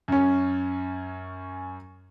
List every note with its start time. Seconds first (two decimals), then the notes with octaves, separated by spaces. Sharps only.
0.08 F#2 C#4